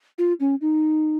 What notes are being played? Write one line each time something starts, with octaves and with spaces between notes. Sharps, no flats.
F4
C#4
D#4